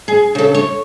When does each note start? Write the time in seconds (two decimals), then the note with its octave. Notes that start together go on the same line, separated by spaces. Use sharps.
0.08 G#4
0.35 C#3 A4
0.54 C#5